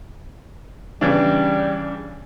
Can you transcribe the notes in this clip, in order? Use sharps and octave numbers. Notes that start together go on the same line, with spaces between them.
C#3 E3 G3 D4